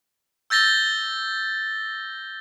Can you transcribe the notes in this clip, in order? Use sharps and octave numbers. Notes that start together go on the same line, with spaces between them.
E6 G6 A6 A#6 G7